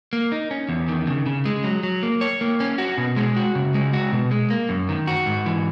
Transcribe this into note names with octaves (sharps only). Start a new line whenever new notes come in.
A#3
D#4
C#4
E2
D#3
C#3
C#3
G#3
F#3
F#3
A#3
C#5
A#3
C#4
F#4
B2
G#3
F#4
C#3
G#3
F#4
B2
G#3
A#3
F#2
D#3
F#4
G#2
E3